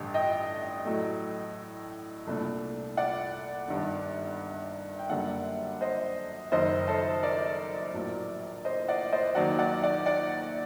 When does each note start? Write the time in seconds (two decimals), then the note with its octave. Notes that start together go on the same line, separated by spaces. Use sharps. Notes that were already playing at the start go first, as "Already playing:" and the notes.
Already playing: A1 G2 D3 G4
0.14 D#5 G5
0.85 A2 F#3 A3
2.27 C2 A#2 A3 D4
2.97 D5 F#5
3.68 G1 G2 D#3 G3
4.99 G5
5.10 F#2 D3 G3 A#3 D5 F#5
5.81 C5 D#5
6.52 F#1 F#2 D#3 C5 D#5
6.87 A4 C5
7.23 A#4 D5
7.94 A#1 A2 F#3
8.65 C5 D#5
8.88 D5 F#5
9.12 C5 D#5
9.35 D#2 D#3 F#3 D5 F#5
9.59 D5 F#5
9.83 D5 F#5
10.06 D5 F#5